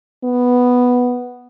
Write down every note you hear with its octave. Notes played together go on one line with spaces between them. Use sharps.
B3